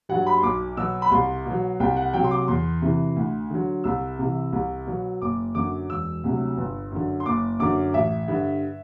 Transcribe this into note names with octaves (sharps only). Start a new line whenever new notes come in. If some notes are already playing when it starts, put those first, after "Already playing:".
G2 F#3 F#5
B5
C6
B1 D6
B2 F#3 E6
B5
C2 C6
B2 F#3
C2 G5
F#5
C3 F#3 G5
C6
D6
E2 C6
C3 E3
D2
D3 F#3
C2 E6
C3 E3
C2
B2 F#3
F#1 D6
F#2 D3 F#3 D6
E1 E6
D2 C3 F#3
G1
F#2 D3
C6
F#1 D6
F#2 D3 D6
A1 E5
G2 D3